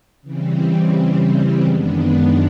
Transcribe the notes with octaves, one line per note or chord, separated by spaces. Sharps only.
C#3 E3 G3 C4
F#2 D#3 G#3 B3 D4